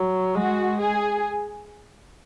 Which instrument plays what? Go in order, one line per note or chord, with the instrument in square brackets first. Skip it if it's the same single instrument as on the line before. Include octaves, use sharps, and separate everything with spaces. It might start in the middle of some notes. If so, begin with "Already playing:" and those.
Already playing: [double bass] F#3
[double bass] G#3 [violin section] F#4
[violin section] G#4